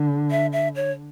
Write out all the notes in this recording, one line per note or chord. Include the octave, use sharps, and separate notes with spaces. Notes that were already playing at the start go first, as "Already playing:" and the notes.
Already playing: D3
E5
E5
C#5